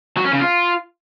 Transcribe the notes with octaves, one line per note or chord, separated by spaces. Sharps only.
F#3
C#4
C#3
F4